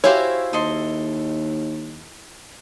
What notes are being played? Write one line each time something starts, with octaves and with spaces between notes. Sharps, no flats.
E4 F#4 G4 C5 C#5 E5 F5 G#5
D#2 A4 D#5 C6